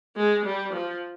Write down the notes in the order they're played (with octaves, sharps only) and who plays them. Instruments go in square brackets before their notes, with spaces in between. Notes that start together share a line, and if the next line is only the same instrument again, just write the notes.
[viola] G#3
G3
F3